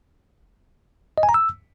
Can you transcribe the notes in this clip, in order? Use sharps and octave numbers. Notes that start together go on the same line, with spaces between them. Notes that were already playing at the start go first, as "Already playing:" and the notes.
D#5
G#5
A#5
E6